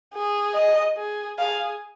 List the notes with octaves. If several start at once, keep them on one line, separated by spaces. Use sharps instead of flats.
G#4
D#5
G#4
G#4 F5